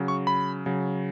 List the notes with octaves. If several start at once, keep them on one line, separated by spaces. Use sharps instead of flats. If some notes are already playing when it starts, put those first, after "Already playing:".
Already playing: C#3 F#3
C#6
B5
C#3 F#3